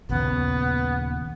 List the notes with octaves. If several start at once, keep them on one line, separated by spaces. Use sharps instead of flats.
A#1 D#2 C#3 B3